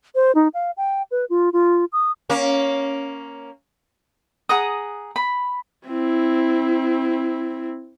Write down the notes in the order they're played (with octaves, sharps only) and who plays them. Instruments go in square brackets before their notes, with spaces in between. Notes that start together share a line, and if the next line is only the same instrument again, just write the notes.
[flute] C5
D#4
F5
G5
B4
F4
F4
D#6
[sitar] A#3 C#4
[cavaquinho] G#4 F#5 A#5 D#6
B5
[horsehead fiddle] C4 E4